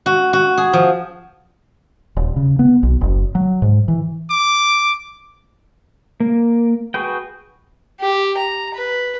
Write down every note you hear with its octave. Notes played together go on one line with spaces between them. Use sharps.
F#4
F#4
G#4
F3
D#1
C#3
B3
B1
F#1
F#3
G#2
E3
D6
A#3
F#4 G#4 B4 G5
G4
A#5
B4